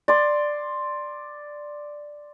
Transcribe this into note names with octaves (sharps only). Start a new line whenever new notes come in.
D5 C6